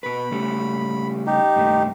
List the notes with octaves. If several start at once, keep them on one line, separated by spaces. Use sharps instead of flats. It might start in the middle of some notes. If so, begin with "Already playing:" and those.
B2 B4 B5
C#3 G3 A3
D#4 G4
G2 C3 A3